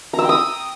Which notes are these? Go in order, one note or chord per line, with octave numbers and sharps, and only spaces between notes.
A#5
E6
G5
D#6